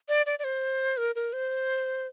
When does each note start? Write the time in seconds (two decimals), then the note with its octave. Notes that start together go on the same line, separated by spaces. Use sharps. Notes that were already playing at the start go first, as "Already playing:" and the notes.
0.09 D5
0.26 D5
0.39 D5
0.44 C5
0.97 A#4
1.15 A#4
1.33 C5